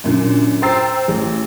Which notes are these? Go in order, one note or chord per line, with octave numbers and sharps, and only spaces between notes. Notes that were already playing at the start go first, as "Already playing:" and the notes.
F#2 A#2 D3
C5 G5 A#5 E6 A6 C7
A1